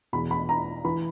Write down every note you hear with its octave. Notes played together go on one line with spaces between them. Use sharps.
E2 B2 B5
B5
A#5
E3 B5